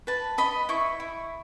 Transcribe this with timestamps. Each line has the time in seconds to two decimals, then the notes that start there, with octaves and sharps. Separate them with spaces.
0.07 B4 A5
0.38 D#5 B5
0.69 E4 C#6
1.00 E4